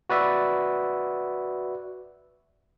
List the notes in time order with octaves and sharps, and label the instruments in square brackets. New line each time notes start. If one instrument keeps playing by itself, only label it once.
[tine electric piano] F#4 B4 D5 E5